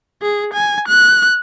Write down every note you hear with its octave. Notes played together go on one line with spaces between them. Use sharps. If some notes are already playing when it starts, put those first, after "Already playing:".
G#4
G#5
F#6